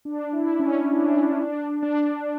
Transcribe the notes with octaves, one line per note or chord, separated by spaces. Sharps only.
D4
E4
C#4
D4
D4
D4